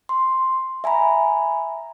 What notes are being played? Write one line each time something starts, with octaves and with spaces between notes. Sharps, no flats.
C6
E5 G#5 A#5 B5